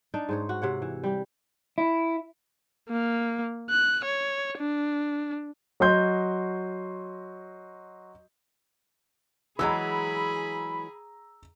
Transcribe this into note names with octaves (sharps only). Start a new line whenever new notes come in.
D4 D#4 D5
G#2 C5 C#5
F#4
C3 C#5 F#5
E3
G3 G4
E4
A#3
F#6
C#5
D4
F#3 F#4 D#5 C6 G6
E3 F#3 G#3 G#4 A#5 B5 E6